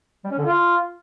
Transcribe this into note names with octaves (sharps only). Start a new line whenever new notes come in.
G3
C#4
D3
F4